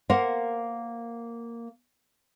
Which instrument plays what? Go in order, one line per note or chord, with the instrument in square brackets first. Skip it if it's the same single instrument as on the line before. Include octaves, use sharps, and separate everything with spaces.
[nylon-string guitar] A#3 A#4 C5 F5 F#5